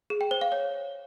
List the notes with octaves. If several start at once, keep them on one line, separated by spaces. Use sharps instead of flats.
G#4
G5
C5
F5
C#5